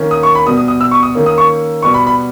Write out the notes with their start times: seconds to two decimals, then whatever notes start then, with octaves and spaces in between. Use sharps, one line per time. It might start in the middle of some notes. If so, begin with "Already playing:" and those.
Already playing: D#3 A#3 C#4
0.11 D#6
0.23 C#6
0.35 B5
0.46 B2 G3 B3 D#6
0.57 D#6
0.68 D#6
0.81 E6
0.91 C#6
1.03 D#6
1.15 D#3 A#3 C#4
1.26 D#6
1.38 C#6
1.82 B2 G3 B3 C#6
1.94 B5
2.06 B5